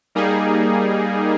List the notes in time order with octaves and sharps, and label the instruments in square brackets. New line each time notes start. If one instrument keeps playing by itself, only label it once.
[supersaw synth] G3 A#3 D#4 G#4